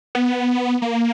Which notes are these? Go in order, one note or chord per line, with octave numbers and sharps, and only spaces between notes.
B3
A#3